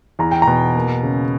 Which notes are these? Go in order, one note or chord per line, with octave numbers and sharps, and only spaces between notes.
E2 A#5
G5
A#5
B2
A#3
C#3